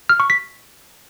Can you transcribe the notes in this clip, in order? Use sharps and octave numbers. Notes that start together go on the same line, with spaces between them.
F6
C#6
B6